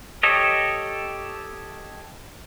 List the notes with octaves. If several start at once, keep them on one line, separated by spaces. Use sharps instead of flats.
G4 A4 C#5 D#5